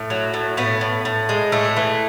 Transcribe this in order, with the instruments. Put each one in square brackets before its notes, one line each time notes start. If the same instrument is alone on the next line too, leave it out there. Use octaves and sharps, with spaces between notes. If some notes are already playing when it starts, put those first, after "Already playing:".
Already playing: [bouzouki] A2
F#3
A2
A2 B3
A2
A2
G#3
A2 A3
E3